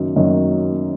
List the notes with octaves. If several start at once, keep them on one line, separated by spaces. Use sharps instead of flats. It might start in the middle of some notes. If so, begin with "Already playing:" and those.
Already playing: F#2 D#3 F#3
F#2 D#3 F#3